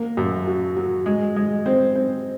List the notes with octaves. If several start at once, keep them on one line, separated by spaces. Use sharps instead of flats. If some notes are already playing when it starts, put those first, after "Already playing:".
Already playing: A#3
F#2
F#3
F#3
G#3
G#3
C4
C4